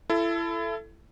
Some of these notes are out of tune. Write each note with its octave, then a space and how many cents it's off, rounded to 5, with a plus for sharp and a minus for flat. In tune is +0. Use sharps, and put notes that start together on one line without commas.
E4 +30 A4 +0